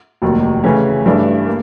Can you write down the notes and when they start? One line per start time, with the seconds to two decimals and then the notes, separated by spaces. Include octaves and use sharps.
0.22 F1 D#2 D#3 F#3
0.64 C#3 E3 A3 C#4
1.06 G2 E3 A3 D4
1.47 A#3